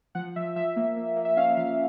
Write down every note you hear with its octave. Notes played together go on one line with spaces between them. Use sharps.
F3 F#5
F3 E5
F3 E5
A#3
A#3
A#3
E5
C#4 F5
F3 F5